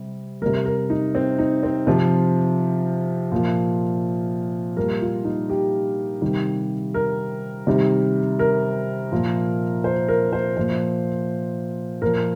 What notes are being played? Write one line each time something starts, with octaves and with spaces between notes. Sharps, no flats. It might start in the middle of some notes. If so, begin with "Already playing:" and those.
Already playing: C3 G3
C3 G3 A#4
A#4
D#4
C4
D#4
C4
C3 F3 F4
A#2 F3
A#2 G3 A#4
F4
D#4
G4
C3 D#3 G3
A#4
C3 D#3 G3
A#4
A#2 F3
C5
A#4
C5
A#2 F3 C5
A#2 F3 A#4